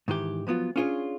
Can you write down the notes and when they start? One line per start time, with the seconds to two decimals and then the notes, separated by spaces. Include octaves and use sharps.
0.08 G#2 D#3 E3 G4
0.47 F3 F#3 B3 F4
0.76 C#4 D4 F4 G#4 C#5